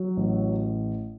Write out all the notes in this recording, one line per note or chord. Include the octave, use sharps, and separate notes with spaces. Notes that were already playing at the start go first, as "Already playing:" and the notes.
Already playing: F#3
A1